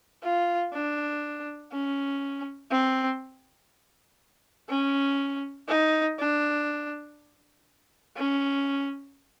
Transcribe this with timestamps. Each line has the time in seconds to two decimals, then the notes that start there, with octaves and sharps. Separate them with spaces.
0.23 F4
0.73 D4
1.72 C#4
2.71 C4
4.69 C#4
5.68 D#4
6.19 D4
8.16 C#4